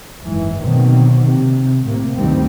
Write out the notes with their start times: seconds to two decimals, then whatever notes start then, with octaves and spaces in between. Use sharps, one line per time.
0.22 F#1 G#2 E3
0.59 B2 D3 D#3 F#3 A#3 C4
1.27 C3
1.84 A2 C3 A#3
2.17 D2 G2 D#3 F3 G3 C4